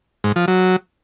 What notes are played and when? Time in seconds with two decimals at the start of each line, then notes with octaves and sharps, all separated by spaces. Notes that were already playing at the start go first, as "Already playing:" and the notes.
0.24 G#2
0.36 F3
0.48 F#3